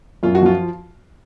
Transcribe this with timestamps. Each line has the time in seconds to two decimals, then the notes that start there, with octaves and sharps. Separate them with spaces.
0.23 F#2 F4
0.35 F#4
0.41 F3 F4